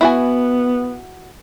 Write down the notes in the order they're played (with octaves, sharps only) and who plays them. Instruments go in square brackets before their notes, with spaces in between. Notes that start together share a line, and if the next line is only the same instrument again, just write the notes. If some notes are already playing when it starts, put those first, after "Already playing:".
[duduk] B3 [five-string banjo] E4 F#4 G#5